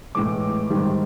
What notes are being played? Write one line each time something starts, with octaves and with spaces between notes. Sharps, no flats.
A2 E3 G#3 D6
G#2 D#3 G3